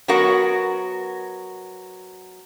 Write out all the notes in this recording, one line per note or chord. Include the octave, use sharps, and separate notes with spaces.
F#3 B3 F#4 A#4 F#5